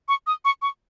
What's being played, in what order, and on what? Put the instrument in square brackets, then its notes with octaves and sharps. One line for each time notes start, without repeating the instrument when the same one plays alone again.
[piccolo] C#6
D#6
C#6
C#6